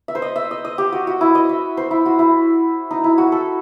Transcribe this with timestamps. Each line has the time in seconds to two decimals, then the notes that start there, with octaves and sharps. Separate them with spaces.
0.08 E5
0.15 C5
0.22 D#5
0.36 E5
0.51 D#5
0.65 D#5
0.78 G4
0.92 F#4
1.07 F#4
1.21 E4
1.35 D#5
1.49 E5
1.77 C5
1.91 E4
2.06 F#4
2.19 E4
2.91 D#4
3.04 E4
3.18 F#4
3.32 A4